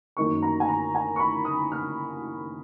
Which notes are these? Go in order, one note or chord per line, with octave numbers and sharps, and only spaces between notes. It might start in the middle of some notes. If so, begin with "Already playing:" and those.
F#2 D#3 A#3 D#4 C#6
A#5
G#5
A#5
G#5
C#6
B5
D#6
F6